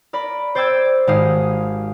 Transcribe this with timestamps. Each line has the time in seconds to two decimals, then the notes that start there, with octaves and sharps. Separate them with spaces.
0.13 A#4 D5 B5
0.55 C5 D5 G5 D6 E6 G#6
1.07 G#1 G4 F5 D#6